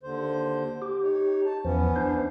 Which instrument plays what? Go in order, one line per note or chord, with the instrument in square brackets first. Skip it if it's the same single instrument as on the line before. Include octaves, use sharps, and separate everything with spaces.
[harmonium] D#2 D3 C5
[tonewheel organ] G4
[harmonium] D#4 C#5
A5
[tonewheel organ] E2 F3 [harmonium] E3 B3 C#4
[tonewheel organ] D4 C5